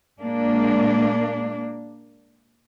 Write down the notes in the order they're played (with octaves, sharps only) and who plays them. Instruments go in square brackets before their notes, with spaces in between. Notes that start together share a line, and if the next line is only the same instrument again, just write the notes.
[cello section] A#2 G#3 A#3 D4